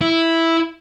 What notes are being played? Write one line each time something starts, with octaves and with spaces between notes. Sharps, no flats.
E4